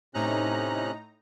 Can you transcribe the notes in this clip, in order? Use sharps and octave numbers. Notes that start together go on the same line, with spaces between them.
A2 C3 C#4 D#4 A#5 F#6